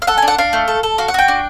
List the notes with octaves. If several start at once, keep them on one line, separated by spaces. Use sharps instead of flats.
F5
A4 F#5
G#5
D4
F#5
D4 F5
A3
A4
A4
F#4 F5
F#5
F#4 G5
D4